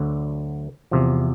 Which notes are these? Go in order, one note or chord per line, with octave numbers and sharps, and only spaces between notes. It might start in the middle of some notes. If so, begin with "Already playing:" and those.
Already playing: D2 D3 F#3
E2 C3 F3